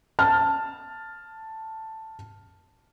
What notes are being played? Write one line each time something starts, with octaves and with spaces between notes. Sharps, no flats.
A5 F6